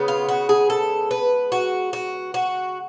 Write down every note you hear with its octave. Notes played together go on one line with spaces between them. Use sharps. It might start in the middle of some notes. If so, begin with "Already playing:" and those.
Already playing: C#3 G#3 B3
F4
F#4
G#4
A4
B4
F#4
F#4
F#4